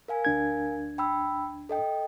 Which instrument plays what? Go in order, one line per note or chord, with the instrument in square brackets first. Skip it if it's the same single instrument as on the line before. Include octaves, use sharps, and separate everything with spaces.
[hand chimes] A#4 F5 G#5
[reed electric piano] D2 D4 G#6
[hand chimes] G5 B5 E6
A4 D#5 G5